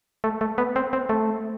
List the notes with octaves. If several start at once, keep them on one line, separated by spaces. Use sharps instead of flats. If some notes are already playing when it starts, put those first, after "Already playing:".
A3
A3
B3
C4
C4
A3